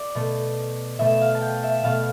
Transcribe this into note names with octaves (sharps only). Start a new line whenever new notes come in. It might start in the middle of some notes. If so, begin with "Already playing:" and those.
Already playing: D5
B2 A3
B2 A3 E5
F5
A5
G5
E5
B2 A3 F5